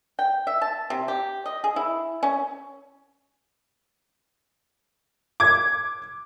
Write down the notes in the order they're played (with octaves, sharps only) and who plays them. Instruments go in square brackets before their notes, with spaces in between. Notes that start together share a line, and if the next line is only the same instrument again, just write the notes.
[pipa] G5
E5
A5
C3
G4
D#5
G#4
E4
C#4
[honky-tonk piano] D6 G#6